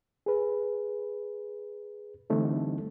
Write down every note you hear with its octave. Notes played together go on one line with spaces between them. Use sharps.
G#4 B4
D3 E3 G3 A3 C4 D#4